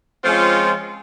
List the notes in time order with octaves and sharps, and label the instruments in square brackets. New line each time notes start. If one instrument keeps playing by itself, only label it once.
[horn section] F3 G#3 C4 C#4 F4